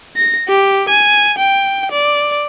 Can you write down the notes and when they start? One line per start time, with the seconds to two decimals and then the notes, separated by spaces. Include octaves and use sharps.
0.17 A#6
0.48 G4
0.89 G#5
1.38 G5
1.91 D5